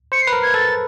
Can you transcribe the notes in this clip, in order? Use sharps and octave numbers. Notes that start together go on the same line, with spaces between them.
C5 C#7
C7
B4
A#4
G#6
A4 A6